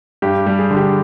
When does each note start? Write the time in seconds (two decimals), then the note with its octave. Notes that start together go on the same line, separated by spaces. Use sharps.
0.22 G2 G4
0.46 G3
0.59 G#4
0.71 D3
0.77 G4